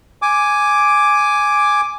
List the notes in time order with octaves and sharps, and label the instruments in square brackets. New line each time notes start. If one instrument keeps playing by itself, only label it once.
[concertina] G#5 D6